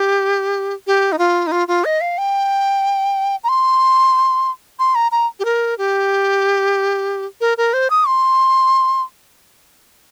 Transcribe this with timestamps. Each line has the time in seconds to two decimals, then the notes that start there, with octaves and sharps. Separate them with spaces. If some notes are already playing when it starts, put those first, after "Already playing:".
Already playing: G4
0.87 G4
1.12 D#4
1.19 F4
1.47 D#4
1.52 F4
1.68 F4
1.85 D#5
2.01 F5
2.18 G5
3.44 A#5
3.49 C6
4.79 C6
4.95 A#5
5.12 A#5
5.39 G4
5.45 A#4
5.78 G4
7.41 A#4
7.58 A#4
7.73 C5
7.90 D#6
8.07 C6